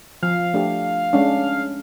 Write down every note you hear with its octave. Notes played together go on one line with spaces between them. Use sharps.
F3 F5
A3 D4 G4
G#3 C#4 D4